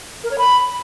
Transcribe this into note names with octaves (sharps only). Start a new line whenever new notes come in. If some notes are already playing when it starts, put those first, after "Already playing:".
A#4
C#5
B5